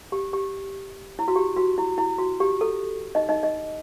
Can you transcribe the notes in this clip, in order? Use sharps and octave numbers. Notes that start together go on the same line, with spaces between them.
G4
G4
E4
F#4
G4
F#4
E4
E4
F#4
G4
A4
D#4 D#5
D#4 D#5
D#4 D#5